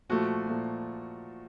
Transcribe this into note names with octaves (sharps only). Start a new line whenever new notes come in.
A#2 F3 A3 F#4
A#2 F3 A3